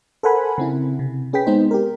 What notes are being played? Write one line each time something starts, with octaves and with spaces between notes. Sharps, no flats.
A4 A#4 C5 F#5 G#5 B5
C#3 C4 E4
C3
C#4 G#4 B4 G5 B6
G#3 B3 C4 D#4 C5
G4 A#4